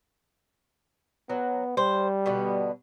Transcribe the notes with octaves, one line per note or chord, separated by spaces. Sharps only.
F#3 B3
G3 C5
B2 D3 B3